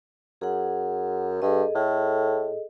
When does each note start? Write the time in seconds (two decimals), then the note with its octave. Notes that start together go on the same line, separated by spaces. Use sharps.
0.41 F#2 G#4 F#5
1.42 G2 G#4 A4 D#5
1.75 A2